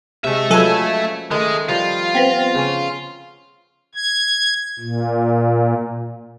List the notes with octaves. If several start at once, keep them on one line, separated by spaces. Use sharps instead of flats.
C3 G#3 A3 E5
F3 F#3 C#4 A4 B4 G#5
D#3 G#3 A3
F3 G3 F4
B3 C4
C#3 C#4
G#6
A#2